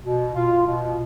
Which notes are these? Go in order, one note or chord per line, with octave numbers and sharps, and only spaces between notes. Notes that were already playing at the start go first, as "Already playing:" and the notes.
B2
F4
B2